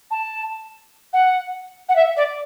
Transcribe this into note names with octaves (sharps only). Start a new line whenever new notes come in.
A5
F#5
F#5
E5
D5